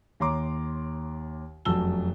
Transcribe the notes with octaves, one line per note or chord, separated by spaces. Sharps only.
D#2 C#5 A#5 C6 D6
F1 F#2 F#4 A5 E6 G7